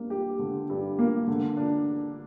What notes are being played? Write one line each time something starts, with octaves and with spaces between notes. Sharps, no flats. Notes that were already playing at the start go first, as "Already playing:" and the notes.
Already playing: G2 A#3
G4
D3
G2
A#3
D3
D4